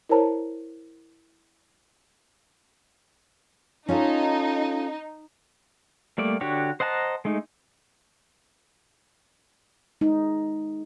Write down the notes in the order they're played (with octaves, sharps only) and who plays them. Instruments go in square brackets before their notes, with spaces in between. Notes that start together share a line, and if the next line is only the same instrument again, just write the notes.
[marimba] E4 A#4 C5 C#5 A5 A#5
[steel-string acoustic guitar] C#4 F4 A4 [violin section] D#4
[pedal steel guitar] G3 A3 A#3 D5
D3 D4 F#4 G4 C#5
C5 D#5 F#5 A5 A#5
G#3 A3 D#4
[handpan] G#3 D#4